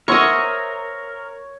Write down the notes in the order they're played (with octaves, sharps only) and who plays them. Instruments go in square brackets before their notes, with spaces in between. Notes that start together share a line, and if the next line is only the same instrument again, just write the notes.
[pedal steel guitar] A#4 [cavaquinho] C5 E5 F#5 [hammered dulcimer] C#5 [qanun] D#5 C#6